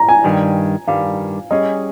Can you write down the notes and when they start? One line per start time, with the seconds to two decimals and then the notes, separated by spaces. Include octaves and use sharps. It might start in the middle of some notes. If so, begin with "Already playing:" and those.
Already playing: A#5
0.09 G#5
0.24 G2 D#3 G3
0.88 G2 D#3 G3 F5
1.51 G3 C#4 G#4 D#5